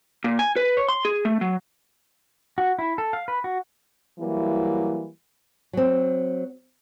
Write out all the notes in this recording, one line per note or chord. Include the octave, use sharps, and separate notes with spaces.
A#2
G#5
B4
C#5
C6
G#4
A3
F#3
F#4
E4
A4
F5
B4
F#4
E3 F#3 G3 A#3 E4
F#3 C4